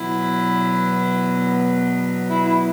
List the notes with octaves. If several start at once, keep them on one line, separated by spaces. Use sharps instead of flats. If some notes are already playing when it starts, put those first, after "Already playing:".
Already playing: E2 B2 F#3 B3 E4
E4